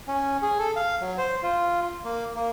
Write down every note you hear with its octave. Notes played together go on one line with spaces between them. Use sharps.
C#4
G#4
A4
F5
F#3
C5
F4
A#3
A#3